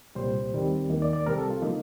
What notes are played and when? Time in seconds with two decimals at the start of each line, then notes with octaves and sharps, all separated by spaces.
0.15 C2 A#2 G3 C5
0.52 D#2 D#3 G3 C4
0.90 D#2 D#3 A#3
1.02 D5
1.13 D5
1.26 C2 C3 G3 C4 A#4
1.38 A4
1.50 F4
1.62 D3 F3 A#3 D#4